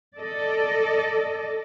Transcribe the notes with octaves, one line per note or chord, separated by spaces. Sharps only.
A4 D5 D#5